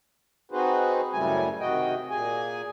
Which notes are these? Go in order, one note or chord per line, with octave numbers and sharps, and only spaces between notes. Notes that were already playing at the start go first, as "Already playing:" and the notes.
C4 D#4 F#4 G#4 B4 C5
F#2 A2 C#3 G3 A3 G#5
C3 D#3 F#4 D#5 G5
A#2 G#4 G#5